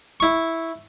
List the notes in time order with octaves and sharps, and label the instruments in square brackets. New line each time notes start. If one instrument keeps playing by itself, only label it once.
[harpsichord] E4 C#6